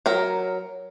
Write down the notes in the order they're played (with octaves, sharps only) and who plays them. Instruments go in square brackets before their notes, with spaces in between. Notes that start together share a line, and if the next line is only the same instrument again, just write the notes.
[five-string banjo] F#3 A#4